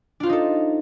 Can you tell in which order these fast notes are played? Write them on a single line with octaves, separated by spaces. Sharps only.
D4 F4 C5 D#4 A4